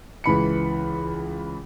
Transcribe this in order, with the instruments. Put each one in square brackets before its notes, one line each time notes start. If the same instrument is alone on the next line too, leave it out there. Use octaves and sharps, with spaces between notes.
[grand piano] C#2 E3 B5 C#7